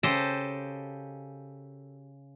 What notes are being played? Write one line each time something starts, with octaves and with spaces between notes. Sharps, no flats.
C#3 G4 A4 C5 D#5 A5